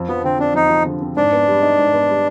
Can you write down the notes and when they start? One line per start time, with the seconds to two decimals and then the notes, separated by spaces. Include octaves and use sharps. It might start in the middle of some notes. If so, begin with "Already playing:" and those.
Already playing: F2
0.08 F3 B3
0.23 D3 C4
0.39 C4 D4
0.54 F2 D#4
0.70 F3
0.85 D3
1.01 C4
1.17 G#2 D4
1.32 B3
1.47 G3
1.62 D#4
1.79 G#2
1.94 B3
2.09 G3